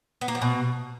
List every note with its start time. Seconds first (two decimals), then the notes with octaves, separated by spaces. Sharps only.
0.21 B3
0.28 A#3
0.35 F3
0.42 B2